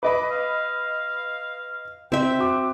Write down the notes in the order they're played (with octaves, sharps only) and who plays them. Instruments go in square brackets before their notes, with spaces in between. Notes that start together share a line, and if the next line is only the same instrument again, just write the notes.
[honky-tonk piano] B4 D#5 B5 [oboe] D6
[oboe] F5
[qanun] C4 E5 [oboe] G5
[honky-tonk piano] F#4 D6